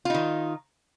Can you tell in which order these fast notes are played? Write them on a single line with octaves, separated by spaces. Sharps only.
F4 D#4 D#3